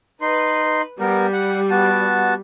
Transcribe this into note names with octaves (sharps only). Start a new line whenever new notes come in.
D#4 B4 C6
G3 B3 A#4
F#5
B3 F#4 A5